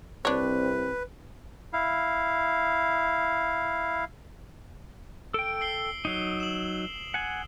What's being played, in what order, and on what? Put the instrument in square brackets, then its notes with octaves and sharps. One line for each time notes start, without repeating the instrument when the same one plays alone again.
[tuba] C2 [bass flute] C4 [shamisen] D4 C#5 [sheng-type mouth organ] B4
[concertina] E4 F5
[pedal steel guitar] A4 G5 [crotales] D7
[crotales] E6 C7 G7
[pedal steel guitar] F#3 D#4 [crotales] D#6 C7 G7
[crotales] E7 F#7
[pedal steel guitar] F#5 G#5